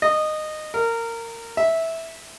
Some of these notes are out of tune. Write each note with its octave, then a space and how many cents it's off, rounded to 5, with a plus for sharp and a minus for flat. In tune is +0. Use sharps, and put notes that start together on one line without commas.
D#5 -15
A#4 -20
E5 -10